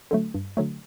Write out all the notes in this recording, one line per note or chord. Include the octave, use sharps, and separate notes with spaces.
D3 F#3 A3
G2
D3 F#3 A3